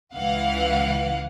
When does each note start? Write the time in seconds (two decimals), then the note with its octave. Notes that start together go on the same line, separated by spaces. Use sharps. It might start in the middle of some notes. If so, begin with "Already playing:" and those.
0.14 C#2 E3 F5 F#5